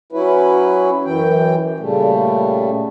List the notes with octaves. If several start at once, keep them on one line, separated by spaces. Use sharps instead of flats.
F#3 C#4 E4 B4
F#2 E3 G5
A#2 C#3 G3 A3